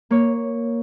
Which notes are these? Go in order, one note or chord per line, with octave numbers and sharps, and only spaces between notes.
A#3 C#5